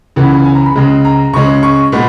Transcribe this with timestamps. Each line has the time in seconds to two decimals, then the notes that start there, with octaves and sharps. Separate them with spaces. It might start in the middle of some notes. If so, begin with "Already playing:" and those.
0.16 C#2 C#3 E3 B3
0.45 G#5
0.55 A#5
0.66 B5
0.76 C#2 C#3 G#3
1.05 A#5
1.33 C#2 C#3 G#3 C#4 C#6
1.63 C#6
1.92 A#2 G#3 B3